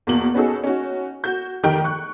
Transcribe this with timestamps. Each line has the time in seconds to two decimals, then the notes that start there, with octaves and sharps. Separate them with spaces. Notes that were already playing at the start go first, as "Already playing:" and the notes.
0.07 E2 B2 A#3 F#7
0.34 B3 C#4 D#4 F#4 G#4 A4
0.64 C#4 D#4 F#4
1.24 F#4 G6
1.63 F1 D#3 G4 A#4 G5 G6
1.84 C#6 F#6